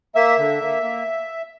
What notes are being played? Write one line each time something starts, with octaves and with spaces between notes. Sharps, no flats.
A#3 E5
D3
A#3
A#3